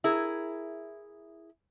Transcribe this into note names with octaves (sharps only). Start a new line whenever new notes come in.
E4 G#4 A#4